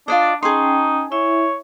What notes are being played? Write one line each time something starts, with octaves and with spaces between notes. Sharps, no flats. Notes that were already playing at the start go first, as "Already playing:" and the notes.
D4 F4 D5 D#5
C#4 D#4 G#4 G5 A5 C6
E4 C#5 E5